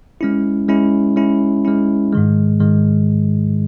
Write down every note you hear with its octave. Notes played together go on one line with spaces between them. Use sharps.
G#3 C#4 E4
G#3 C#4 E4
G#3 C#4 E4
G#3 C#4 E4
G#2 D#3 G#3
G#2 D#3 G#3